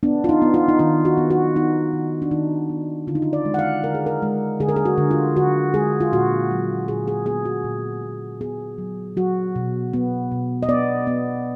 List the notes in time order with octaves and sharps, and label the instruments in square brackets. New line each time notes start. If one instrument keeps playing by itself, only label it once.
[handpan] B3 D4
F4
D#4
B3
F4
D#4
D#3 F4
F#4
B3
F#4
B3 D#4
D#3
D4
D#3 D#4
B3
D3 F4
D#4
F4
D5
G#3
F#5
F5
D3 A#4
G#4
A#4
G#3
D3 G#4
A#4
G#4
F#4
D3
F4
D3 F#4
G#3 G#4
F4
A#2 F#4
F#3
A#2 G#4
G#4
B3 G#4
F#4
A#2
A#2
B3 G#4
F#3
F#3 F#4
B2
B3
B2
D#5
B3 D5
B3